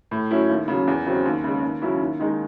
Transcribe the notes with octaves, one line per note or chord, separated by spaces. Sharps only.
A2
F#3 C#4 E4
D#2
C#3 F#3
E2
C#3 F#3 C4
D#2
C#3 G#3
D#2
C#3 F#3 C#4 E4
D#2
D#3 G#3 D#4